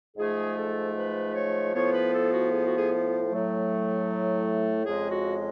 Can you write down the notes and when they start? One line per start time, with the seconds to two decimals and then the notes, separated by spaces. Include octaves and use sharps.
0.17 G#2 F3 A3 G#4
0.56 A4
0.95 B4
1.34 C#5
1.73 A2 F3 B3 C#5
1.93 B4
2.13 A4
2.31 F#4
2.51 G#4
2.64 F#4
2.77 G#4
3.30 A2 F#3 A3
4.85 F2 C#3 G#3 G#4
5.11 F#4